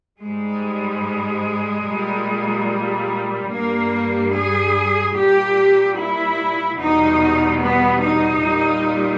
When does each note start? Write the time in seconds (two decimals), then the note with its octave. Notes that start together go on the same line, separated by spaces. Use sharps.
0.21 G#2 G3 G#3
1.85 A#2 G3
3.50 G2 G3 A#3
4.32 G#4
5.14 A#2 G3 G4
5.96 E4
6.78 E2 B2 G3 D#4
7.60 B3
8.01 D#4
8.42 A#2 G3